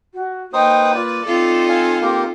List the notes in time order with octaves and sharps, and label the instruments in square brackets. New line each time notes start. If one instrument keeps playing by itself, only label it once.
[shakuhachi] F#4
[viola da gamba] A#3 B4 [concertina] D#4 C5 D#6 [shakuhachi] G5
[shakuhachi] F4 [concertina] D5
[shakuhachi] C4 [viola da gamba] D#4 F4 A4
[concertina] F5 G#5
A#3 G4 A#4